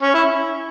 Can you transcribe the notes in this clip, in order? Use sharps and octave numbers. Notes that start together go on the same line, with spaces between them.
C#4
E4